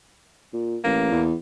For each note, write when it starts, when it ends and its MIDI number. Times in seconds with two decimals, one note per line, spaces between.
0.53 0.78 46
0.84 1.09 33
0.84 1.23 58
1.11 1.34 40